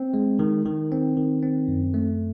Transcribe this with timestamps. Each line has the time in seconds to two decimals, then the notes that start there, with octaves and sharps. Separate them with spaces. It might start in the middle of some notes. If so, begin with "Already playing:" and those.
Already playing: C4
0.14 G#3
0.39 D#3
0.65 D#3
0.92 C4
1.17 D#3
1.43 C4
1.68 F#2
1.94 A3